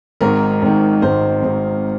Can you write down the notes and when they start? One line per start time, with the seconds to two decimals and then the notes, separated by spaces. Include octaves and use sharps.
0.21 G#1 G#2 D#3 A#4
0.62 G#1 G#2 D#3
1.02 G#1 G#2 D#3 C5
1.43 G#1 G#2 D#3